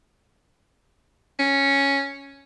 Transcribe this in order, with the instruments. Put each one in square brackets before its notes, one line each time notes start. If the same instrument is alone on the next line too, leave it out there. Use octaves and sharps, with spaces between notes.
[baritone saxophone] C#4